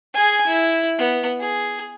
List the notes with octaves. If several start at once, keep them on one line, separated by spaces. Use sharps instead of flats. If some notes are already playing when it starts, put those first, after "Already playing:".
G#4 G#5
E4
B3
G#4